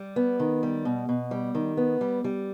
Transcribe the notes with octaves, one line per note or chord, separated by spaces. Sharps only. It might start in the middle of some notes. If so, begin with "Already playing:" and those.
Already playing: G3
B3
D#3
G3
B2
B2
G3
D#3
B3
G3
G3